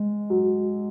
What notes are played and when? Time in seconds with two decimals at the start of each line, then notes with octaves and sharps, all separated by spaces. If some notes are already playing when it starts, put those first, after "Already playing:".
Already playing: G#3
0.30 F#3